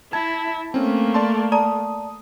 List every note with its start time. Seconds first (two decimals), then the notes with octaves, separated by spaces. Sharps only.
0.13 E4 A5 G#6
0.74 A3 A#3 C4 C#4
1.14 D5 A5 C6
1.52 D5 A5 A#5 D#6